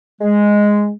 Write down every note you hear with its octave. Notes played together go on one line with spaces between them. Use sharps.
G#3